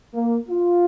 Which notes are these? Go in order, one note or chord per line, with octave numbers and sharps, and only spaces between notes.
A#3
F4